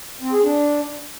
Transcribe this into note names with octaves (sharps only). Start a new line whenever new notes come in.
C4
G#4
D4